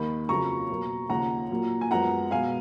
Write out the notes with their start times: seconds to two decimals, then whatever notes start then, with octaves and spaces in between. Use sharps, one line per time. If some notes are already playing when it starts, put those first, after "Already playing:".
Already playing: D#2 D#3 A#3 B5
0.29 F2 C#3 F#3 A#3 A#5 C#6
0.70 B2 F#3 A#3
1.09 D#2 C#3 F3 F#5 A#5
1.51 A#2 F#3 A#3
1.81 G#5
1.91 F#2 F3 G#3 B3 F#5 A#5
2.31 B2 G#3 B3 F5 G#5